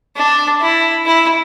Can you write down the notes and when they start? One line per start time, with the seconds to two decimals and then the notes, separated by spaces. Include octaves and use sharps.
0.16 D4
0.61 E4
1.06 E4